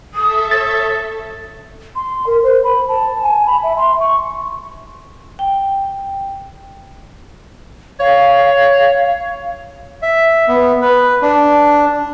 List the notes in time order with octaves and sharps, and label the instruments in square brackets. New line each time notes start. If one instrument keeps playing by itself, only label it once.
[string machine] A4 E5 [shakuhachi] D#6
[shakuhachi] C#5 [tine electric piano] A6
[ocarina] C6
A#4
C5
B5
A5
G#5
B5
E5
C6
C#6
[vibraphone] G5
[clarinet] C#5 [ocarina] F5
[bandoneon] E5
B3
B4
D4